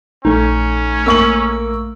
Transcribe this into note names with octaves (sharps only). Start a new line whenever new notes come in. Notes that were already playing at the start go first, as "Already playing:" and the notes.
A#1 A3 C#4 D#4
A#3 C#6 E6 F#7